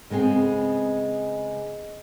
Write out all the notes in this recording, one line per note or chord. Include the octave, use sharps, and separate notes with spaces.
C#3 G#3 B3 C4 G#4